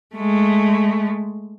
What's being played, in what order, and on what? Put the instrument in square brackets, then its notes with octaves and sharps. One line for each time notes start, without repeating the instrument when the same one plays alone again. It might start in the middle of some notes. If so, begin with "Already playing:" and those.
[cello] G#3 A3